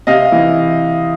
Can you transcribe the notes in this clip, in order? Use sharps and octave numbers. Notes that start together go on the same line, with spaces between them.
C3 D#5 F5
E3